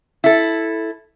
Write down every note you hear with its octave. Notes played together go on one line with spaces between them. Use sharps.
E4 A4